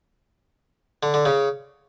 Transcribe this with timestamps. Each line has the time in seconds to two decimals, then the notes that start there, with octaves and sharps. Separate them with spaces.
1.03 D3
1.14 D3
1.25 C#3